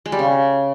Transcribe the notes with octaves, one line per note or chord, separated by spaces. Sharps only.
G#3
G3
C#3